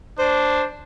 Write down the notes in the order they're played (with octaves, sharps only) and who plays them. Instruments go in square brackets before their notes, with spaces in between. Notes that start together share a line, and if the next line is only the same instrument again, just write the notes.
[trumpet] D4 [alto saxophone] C5